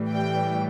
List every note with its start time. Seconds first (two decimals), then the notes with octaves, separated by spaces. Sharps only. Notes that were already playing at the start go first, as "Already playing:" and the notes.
Already playing: A2 E3 G3
0.10 G5